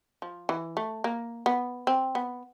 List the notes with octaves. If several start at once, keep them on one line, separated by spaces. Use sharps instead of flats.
F3
E3
A3
A#3
B3
C4
B3